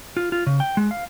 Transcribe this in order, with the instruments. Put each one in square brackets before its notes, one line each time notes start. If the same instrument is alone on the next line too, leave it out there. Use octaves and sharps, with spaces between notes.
[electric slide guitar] F4
F4
C#3
G5
G#3
F5